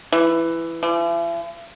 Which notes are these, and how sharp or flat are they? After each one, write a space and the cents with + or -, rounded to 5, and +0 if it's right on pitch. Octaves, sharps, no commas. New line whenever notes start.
E3 +10
E3 +45